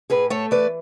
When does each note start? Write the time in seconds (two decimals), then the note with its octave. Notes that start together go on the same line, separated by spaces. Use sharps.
0.10 A2 G#4 B4
0.30 A3 A4 C#5
0.51 E3 B4 D5